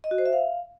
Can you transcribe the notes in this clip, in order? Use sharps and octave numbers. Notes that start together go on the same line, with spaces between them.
D#5
F#4
C5
E5
F5